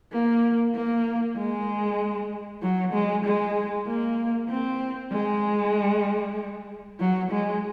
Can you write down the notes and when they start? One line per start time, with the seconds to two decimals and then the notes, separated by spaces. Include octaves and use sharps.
0.12 A#3
0.74 A#3
1.37 G#3
2.62 F#3
2.93 G#3
3.25 G#3
3.87 A#3
4.49 C4
5.12 G#3
7.00 F#3
7.31 G#3